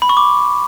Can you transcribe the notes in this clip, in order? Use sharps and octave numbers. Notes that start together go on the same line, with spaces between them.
B5
C#6
D6